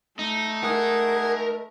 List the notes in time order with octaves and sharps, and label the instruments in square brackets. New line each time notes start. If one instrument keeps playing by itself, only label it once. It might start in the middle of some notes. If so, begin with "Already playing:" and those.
[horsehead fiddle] A3 [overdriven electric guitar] D#4
[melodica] G#4 F#5 [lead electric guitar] A#4